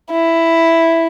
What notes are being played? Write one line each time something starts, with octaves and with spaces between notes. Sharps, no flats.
E4